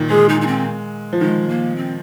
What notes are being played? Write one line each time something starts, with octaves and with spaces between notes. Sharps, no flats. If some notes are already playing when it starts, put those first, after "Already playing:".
Already playing: A#2 D#3
G#3 G#4
D#4
D#4
C4
F3
D#3 G#3
A#3
C4